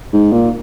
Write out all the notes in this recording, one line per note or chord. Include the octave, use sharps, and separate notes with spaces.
G#2
A#2